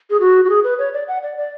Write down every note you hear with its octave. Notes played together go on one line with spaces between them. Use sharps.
G#4
F#4
F#4
G#4
B4
C#5
D5
F#5
D5
D5